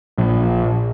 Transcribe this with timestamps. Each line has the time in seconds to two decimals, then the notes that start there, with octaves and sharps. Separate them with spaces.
0.18 A#1